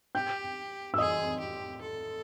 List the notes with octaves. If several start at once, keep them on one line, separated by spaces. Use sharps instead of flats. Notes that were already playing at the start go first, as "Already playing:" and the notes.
G4 G5 G6
E6
G#4 D#5 D#6
G4
A4